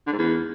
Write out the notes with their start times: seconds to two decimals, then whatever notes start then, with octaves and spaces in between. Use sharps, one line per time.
0.06 D3
0.12 G#2
0.18 E2